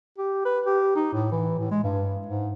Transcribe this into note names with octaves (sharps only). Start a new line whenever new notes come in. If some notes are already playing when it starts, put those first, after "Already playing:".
G4
B4
G4
D#4
A2
E3
A2
G#3
G2
G#2